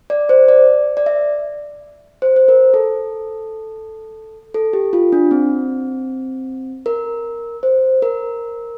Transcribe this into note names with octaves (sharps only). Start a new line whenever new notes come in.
D5
C5
D5
D5
E5
C5
C5
A#4
A4
A4
G4
F4
D4
C4
A#4
C5
A#4